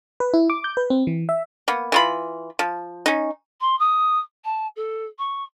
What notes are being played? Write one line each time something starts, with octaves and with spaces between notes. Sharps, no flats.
B4
E4
D6
G6
B4
C4
E3
E5
A#3 B3
E3 F4 B5
F3
C#4 D#4
C6
D#6
A5
A4
C#6